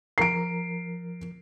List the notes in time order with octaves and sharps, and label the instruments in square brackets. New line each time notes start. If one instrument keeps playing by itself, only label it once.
[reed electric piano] F3 A#4 A#5 [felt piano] C7 D7